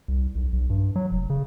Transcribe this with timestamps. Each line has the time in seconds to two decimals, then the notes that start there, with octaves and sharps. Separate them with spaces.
0.08 C2
0.35 B1
0.53 B1
0.70 G2
0.96 F#3
1.12 F1
1.30 C#3